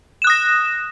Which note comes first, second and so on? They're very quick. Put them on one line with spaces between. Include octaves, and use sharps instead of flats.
E7 F#6 D#6 A#6